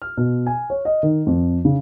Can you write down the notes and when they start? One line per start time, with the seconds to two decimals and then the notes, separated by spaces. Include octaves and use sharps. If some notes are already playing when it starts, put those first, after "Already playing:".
0.02 F6
0.17 B2
0.46 G#5
0.70 C#5
0.85 D#5
1.03 D#3
1.27 F2
1.65 C#3